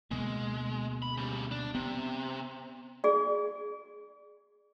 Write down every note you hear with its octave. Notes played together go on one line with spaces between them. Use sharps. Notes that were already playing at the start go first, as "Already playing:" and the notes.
D2 B2 G#3 A#3
B5
C#3 G3
D4
C3 B3 C4
G#4 D5